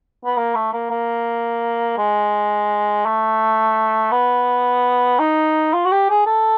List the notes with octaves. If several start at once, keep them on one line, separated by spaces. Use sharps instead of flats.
B3
A#3
A3
A#3
A#3
G#3
A3
B3
D#4
F4
F#4
G4
G#4
A4